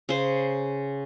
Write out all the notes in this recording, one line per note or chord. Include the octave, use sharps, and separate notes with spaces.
C#3 C5